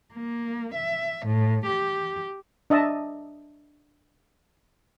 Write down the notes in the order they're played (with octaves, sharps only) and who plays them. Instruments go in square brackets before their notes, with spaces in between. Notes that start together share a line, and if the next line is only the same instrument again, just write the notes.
[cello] A#3
E5
A2
G4
[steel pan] D4 D#5 E5 A5